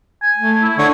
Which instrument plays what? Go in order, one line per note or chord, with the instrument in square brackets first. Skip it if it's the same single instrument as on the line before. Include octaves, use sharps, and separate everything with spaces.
[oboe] G#5
[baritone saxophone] A3
[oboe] E4
[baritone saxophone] D3 [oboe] C#5